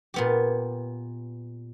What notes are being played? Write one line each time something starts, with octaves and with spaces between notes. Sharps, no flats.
A#2 B3 G4